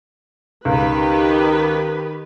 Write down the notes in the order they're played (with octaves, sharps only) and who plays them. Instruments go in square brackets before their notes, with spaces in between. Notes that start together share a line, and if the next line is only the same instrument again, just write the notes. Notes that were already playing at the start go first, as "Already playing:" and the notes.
[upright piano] C#2 [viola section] D#3 G4 B4